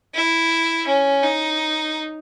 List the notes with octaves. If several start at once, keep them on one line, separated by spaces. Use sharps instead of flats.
E4
C#4
D#4